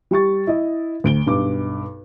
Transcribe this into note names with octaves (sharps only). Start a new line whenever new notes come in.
G3 G4 C#6 A6
E4 D#5
D2 D7 G7
B1 G2 D6